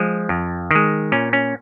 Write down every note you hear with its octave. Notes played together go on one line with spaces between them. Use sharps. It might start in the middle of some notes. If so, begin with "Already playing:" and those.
Already playing: F3 G#3
F2
D#3 G#3
A#2 C#4
C#4